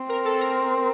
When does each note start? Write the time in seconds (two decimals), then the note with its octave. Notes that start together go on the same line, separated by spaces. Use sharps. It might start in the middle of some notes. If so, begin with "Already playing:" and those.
Already playing: C4
0.09 A#4
0.25 A4
0.41 A#4